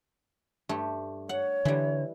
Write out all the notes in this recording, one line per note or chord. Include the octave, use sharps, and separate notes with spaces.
G2 A3 G4
C#5 F#5
D3 E3 G3